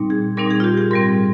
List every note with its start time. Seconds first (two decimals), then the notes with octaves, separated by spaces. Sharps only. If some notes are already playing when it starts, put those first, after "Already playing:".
Already playing: A#2 G3 C4 D#4
0.10 G#4
0.37 A#2 G3 C4 D#4 A#4
0.50 G#4
0.60 F4
0.64 G4
0.77 G#4
0.91 G#2 G3 C4 A#4